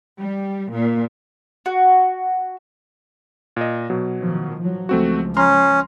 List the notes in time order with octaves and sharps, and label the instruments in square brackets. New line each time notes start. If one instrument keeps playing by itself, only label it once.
[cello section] G3
A#2
[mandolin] F#4
[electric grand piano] A#2 D#5
B2 F#3
[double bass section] A2 D#3 F3
F3 F#3
[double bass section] C#2 F3 [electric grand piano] A3 C4 F#4
[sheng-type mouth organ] C#4 [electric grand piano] A#5 C6 F6